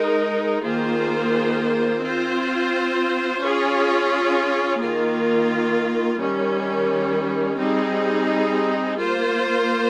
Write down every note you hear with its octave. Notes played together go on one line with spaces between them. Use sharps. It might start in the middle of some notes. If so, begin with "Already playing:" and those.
Already playing: G#3 D#4 A#4
D#3 A#3 F4 G#4 C5
C4 F4 C5
C#4 F4 G#4
D#3 A#3 F4
D#3 G3 C#4
G3 C4 D#4 G#4
A#3 F4 C5